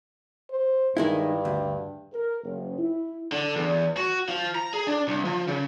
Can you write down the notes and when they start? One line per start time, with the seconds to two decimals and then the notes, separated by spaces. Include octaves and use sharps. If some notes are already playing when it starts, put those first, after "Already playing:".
0.50 C5
0.97 G2 D#3 G#3 E4
1.45 D2
2.12 A#4
2.44 F#1
2.79 E4
3.32 D3
3.56 E2
3.97 F#4
4.28 F3
4.55 A#5
4.74 G#4
4.87 D4
5.08 C2
5.25 F3
5.48 C#3